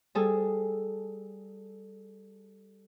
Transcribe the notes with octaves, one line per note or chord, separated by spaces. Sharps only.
G3 G#4 A4